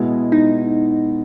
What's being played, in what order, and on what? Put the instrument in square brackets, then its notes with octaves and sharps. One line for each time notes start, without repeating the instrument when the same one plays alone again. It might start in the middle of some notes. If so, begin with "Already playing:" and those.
Already playing: [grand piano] B2 G#3 B3 E4
[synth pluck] D#4